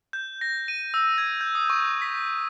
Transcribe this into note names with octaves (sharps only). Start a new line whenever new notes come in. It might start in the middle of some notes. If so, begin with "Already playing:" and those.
G6
A#6
D#7
E6
G#6
G6
D#6
C#6
B6